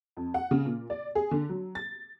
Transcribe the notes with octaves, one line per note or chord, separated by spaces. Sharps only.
F2
F#5
C#3
A#2
D5
G#4
D3
F#3
A6